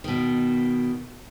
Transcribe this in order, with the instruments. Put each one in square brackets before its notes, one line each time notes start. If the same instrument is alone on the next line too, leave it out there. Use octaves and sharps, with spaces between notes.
[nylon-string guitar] B2 D#3